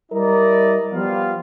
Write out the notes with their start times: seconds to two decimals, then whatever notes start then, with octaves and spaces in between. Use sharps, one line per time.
0.12 G3 E4 A#4 D5 D#5
0.93 F3 G3 B3 F4 F5